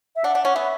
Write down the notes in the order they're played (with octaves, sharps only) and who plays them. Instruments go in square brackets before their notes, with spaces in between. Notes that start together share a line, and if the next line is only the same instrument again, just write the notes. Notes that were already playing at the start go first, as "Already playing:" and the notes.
[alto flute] E5
[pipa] D4 [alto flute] F#5
[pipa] D4
[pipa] C#4 [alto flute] F#5
[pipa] B3 [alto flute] E5